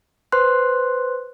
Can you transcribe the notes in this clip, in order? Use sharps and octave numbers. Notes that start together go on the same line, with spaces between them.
B4 C5 C6 F#6